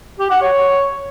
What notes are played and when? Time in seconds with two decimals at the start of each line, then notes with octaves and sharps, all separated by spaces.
0.19 G4
0.30 F#5
0.41 C#5